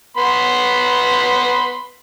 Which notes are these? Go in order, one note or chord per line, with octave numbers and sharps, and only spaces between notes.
B3 B5 C6